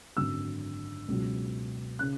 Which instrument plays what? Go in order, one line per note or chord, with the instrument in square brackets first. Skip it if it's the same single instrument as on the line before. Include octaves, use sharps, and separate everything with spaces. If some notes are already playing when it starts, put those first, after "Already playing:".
[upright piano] G#1 F#2 D3 F#3 E6
C#2 B2 F#3
C#3 F#6